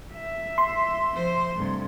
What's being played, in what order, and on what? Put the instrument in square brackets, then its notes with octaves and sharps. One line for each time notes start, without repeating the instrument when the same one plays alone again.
[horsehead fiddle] E5
[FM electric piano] C6
[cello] F3 C5
[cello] G2 C3 [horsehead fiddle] A3